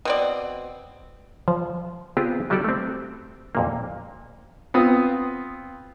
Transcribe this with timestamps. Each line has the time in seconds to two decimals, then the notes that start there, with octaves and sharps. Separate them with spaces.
0.05 B2 C4 D5
1.48 F3
2.17 B3 C4 F4 G4 G#4
2.50 F#3 G3 D#4 G4 A4 D5
2.64 A3 C4
3.55 F2 A#2 A#3
4.74 B3 C4 F4 D#6